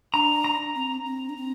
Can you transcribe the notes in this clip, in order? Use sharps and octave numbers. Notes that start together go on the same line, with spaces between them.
D4 A#5
A#5
C4
C4
D4
C4